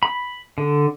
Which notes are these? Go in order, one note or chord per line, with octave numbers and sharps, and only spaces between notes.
B5
D3